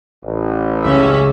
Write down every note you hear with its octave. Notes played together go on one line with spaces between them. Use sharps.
A1
C#2 C#4 E5